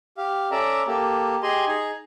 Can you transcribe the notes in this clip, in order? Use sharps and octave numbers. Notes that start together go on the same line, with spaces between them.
G4 F5
C#4 A4 D5 E5 A#5
A#3 G4 A4
G4 G#4 D#5 G#5 C6
D#4 G#4